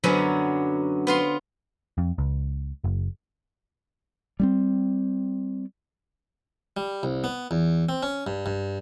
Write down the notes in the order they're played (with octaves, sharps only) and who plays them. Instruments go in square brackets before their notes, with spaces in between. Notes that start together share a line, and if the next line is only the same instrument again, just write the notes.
[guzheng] F#2 D3 F#3 B3 C#4
B3 F4 C6
[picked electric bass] F2
C#2
F#1
[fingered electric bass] G3 B3 C4
[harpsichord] G3
C2
B3
E2
C4
C#4
G2
G2